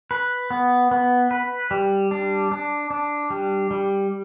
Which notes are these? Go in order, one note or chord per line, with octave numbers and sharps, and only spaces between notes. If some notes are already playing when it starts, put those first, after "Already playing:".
B4
B3
B3
B4
G3
D4
D4
D4
G3
G3